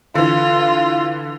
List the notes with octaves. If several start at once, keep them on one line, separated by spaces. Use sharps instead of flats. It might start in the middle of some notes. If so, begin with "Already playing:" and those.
D3 E3 F4